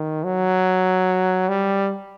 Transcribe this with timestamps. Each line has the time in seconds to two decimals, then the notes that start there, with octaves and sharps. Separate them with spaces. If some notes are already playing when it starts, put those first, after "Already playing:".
Already playing: D#3
0.24 F#3
1.49 G3